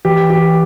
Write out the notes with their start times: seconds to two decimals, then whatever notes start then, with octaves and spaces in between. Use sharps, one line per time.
0.05 E3 G4
0.30 G4